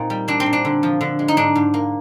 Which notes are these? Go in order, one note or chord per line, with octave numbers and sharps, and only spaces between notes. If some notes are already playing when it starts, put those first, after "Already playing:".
Already playing: A#2 A#3 C4 D#4
G3
C4 D4
C4
A#2
D4
D3
F3
D3
G#3
D#4
G#2 D4
G#2
A#3